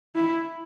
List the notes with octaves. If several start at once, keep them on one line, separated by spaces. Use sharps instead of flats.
E4